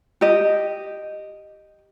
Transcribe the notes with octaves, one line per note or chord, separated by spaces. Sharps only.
G4 D#5